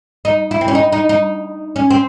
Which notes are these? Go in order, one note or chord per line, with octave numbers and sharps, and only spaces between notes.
D#4
E4
C4
C#4
D#4
D#4
D#4
C#4
C4